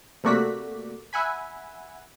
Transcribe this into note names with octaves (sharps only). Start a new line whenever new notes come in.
C3 A3 A#3 F#4 D5 B6
E5 F#5 G#5 B5